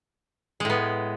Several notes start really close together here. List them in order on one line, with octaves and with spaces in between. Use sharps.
G#3 A2 B3